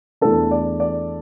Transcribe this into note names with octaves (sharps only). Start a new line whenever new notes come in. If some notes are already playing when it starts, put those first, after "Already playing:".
E2 E3 A3 D4 A4
D5
D5